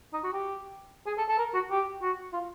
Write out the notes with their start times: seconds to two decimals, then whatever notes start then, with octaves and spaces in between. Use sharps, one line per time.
0.13 D#4
0.24 F#4
0.33 G4
1.07 G#4
1.18 A4
1.29 A4
1.38 A#4
1.54 F#4
1.71 G4
2.02 F#4
2.33 F4